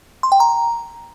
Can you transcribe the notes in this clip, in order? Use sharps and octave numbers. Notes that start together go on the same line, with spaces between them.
C6
G5
A#5